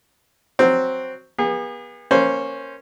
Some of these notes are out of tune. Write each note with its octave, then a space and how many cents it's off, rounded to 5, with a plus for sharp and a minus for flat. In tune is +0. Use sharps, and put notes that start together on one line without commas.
F#3 +0 C4 +0
B3 -40 G#4 -40
A#3 +0 C#4 -10 C5 +0